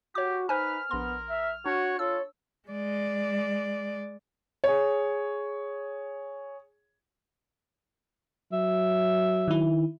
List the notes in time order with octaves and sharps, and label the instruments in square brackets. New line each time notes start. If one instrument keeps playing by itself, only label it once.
[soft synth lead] F#4 [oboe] G4 [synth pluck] C#5 D6
[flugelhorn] D#4 [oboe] B4 [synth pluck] C5 G#5 [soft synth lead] F6
[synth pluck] A#1 C6 [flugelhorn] B3 [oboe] A#4
[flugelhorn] E5
[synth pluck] D4 [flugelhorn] F#4 [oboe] C#5
[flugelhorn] F4 [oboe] A4 [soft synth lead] C#5 [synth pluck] E6
[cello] G#3 D5
[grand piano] G#4 C#5
[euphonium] F#3 [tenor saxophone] E5
[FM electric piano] D#3 E4